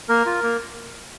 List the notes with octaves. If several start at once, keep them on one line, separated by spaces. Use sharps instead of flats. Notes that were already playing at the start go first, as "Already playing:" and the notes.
A#3 A#4
F4
A#3